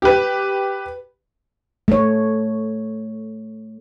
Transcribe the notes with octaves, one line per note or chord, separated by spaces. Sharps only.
G4 B4
A3 C#5